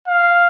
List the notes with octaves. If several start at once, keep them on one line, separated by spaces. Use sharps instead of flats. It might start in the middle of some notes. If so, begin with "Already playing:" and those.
F5